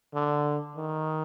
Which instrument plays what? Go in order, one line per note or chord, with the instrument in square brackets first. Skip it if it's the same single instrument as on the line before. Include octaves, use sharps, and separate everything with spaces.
[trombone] D3
D#3